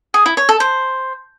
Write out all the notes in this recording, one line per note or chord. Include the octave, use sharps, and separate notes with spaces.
G#4
E4
C#5
A4
C5